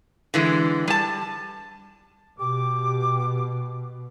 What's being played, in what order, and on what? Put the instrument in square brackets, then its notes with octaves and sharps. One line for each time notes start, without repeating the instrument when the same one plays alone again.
[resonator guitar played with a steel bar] D3 E3 G#3
G3 A5
[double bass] B2 [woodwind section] G4 D6